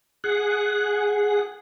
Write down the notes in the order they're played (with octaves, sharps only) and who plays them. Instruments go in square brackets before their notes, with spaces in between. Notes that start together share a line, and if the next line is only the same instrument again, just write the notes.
[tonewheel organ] G#4 F#5